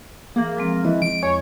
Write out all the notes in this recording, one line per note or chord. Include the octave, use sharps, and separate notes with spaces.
E3 A#3 G#4
F3 G#3 C4
E3 D#5
D7
E2 C#5